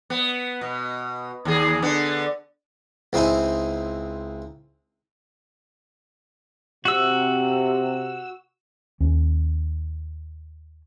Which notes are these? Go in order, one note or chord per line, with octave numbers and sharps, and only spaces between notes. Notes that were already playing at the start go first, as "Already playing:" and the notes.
B3
B2
D#2 G#4
D3 B3
C#2 C4 D#4 E4 G#5
C3 F#4 E6
D#2 C#4